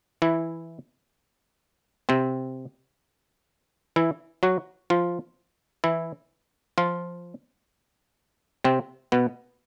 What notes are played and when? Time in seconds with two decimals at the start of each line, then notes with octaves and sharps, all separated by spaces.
0.22 E3 E4
2.09 C3 C4
3.96 E3 E4
4.43 F#3 F#4
4.90 F3 F4
5.84 E3 E4
6.78 F3 F4
8.64 C3 C4
9.12 B2 B3